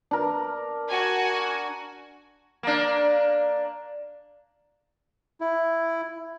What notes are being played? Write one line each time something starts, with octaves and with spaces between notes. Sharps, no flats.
D4 A#4
F#4 G#5
A#3 D4
E4